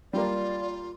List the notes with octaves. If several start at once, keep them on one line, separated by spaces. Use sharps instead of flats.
G3 A#3 F4 D5